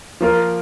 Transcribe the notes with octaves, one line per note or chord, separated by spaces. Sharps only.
F3 A#3 F4 A#4